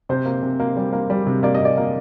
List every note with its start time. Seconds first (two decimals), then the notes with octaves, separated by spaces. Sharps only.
0.09 C3 C5
0.26 A#3
0.43 C3
0.60 A#3
0.77 G3
0.93 A#3
1.10 G3
1.27 C3
1.43 A#3 D5
1.55 D#5
1.60 C3
1.65 D5
1.77 A#3